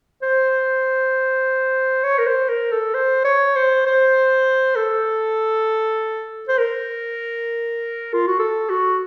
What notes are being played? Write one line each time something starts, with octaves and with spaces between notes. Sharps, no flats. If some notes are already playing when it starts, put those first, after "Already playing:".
C5
C#5
A#4
C5
A#4
A4
C5
C#5
C5
C5
A4
C5
A#4
F4
F#4
A4
F#4